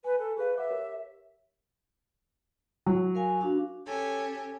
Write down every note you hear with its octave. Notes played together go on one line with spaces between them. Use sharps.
B4 G#5
A4
G#4 B4 F5
B4 E5 F#5 D6
G4 A#4 C#5
F#3
A#4 F5 G#5
D4 F#4 F5
C#4 G4 A4 C#5 G#5